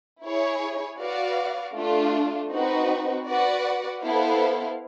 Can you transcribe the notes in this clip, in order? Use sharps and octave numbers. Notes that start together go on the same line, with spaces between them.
E4 G#4 C#5
F#4 B4 D5 F5
A3 D4 F4
C4 D#4 F#4 B4
F#4 B4 D5 F#5
B3 E4 A4 C5 F5